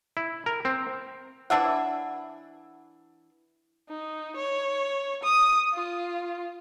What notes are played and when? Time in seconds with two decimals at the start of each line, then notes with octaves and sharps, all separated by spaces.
0.17 E4
0.46 A#4
0.65 C4
1.50 E3 D4 E5 F#5
3.89 D#4
4.36 C#5
5.23 D#6
5.73 F4